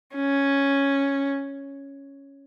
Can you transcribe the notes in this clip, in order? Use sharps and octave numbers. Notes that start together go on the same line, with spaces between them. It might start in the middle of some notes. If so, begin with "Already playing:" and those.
C#4